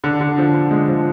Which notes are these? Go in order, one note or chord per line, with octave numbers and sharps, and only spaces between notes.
D3
D3
F3
D3
G#3
F3